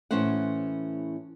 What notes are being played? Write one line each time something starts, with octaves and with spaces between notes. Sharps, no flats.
A2 E3 C#4 B4 C5 F#5